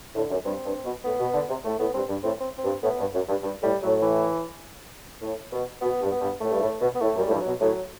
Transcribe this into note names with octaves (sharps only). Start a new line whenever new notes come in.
A2 D3
F#2
G2 C4
G2
B2
A2 B3
B2
D3
C3
A2 A3
A2 B3
G2 C4
G2
A2 C4
C4
C4
G2
A2 B3
G2
F#2
G2
G2
A2 G3
A2 F#3
E3
A2
B2
B2 B3
G2
B3
G2
A2 A3
G2
A2
B2
B3
A2 A3
F#2
G3
A2
G2
E3
F#3
B2
A2 F#3